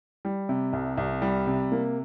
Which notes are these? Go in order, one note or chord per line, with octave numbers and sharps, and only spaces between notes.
G3
C3
C2
C2
G3
C3
A#3